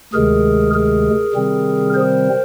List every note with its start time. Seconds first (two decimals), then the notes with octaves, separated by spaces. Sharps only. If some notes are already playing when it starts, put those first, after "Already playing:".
0.13 D2 C3 D#3 G#3 G#4 A#4
0.74 G#4 A#4
1.33 C3 D#3 G3 C4
1.93 A#4 C5